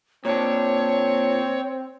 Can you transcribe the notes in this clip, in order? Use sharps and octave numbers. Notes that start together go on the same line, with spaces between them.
A#2 C4 D4 C#5